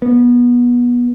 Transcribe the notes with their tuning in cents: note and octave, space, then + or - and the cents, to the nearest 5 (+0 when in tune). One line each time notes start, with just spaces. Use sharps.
B3 -25